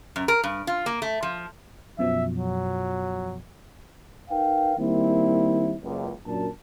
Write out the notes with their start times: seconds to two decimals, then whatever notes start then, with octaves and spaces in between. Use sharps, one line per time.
0.16 F#2
0.28 A#4
0.44 G2
0.67 F4
0.86 A#3
1.02 A3
1.23 F3
1.99 F#2 B2 F3 E5
2.37 F#3
4.30 D#4 A#4 B4 F5 G5
4.78 D#3 G3 A#3 C4 E4
5.82 F#1 C#2
6.26 F#2 A#2 F#3 D4 A#4 A5